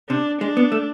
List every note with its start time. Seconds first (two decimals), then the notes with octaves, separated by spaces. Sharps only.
0.09 C3 D4
0.41 G#3 D4
0.57 B3
0.72 A3